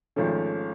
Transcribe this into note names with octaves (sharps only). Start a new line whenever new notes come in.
G#1 G#2 F3 A3 C#4